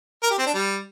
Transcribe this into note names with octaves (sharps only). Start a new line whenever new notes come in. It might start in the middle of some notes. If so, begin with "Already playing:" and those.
A#4
G4
C4
D4
G3